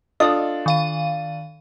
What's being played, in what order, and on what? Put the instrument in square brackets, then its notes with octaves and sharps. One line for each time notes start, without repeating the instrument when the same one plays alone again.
[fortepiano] D4 F4 A4 [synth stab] D#5
[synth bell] D#3 F5 D#7